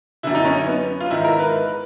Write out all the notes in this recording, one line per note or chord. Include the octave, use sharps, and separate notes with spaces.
F#2 D3 E4
D#4
C#4
B3
F4
G#2 D#3 E4
A#4
B4